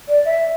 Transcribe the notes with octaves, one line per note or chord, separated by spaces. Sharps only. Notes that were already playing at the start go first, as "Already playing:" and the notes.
D5
E5